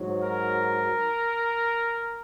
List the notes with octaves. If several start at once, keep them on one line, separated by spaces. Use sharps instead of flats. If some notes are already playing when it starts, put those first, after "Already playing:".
Already playing: G#2 F#3
A#4